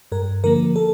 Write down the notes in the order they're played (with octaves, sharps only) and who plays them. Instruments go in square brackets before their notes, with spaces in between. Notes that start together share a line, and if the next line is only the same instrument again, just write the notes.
[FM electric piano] G2 A#4
D3 F3 A#3 A#4
A4